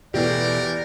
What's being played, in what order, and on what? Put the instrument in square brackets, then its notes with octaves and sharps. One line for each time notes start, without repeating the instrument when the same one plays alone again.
[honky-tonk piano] E2 G4 [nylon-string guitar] B2 E3 A3 [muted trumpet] A#4 [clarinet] D5